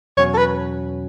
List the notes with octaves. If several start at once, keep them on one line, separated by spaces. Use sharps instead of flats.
E2 B2 F#3 C#4 F#4 C#5
A4
B4